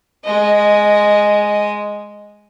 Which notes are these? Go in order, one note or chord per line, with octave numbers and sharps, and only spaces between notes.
G#3 D#5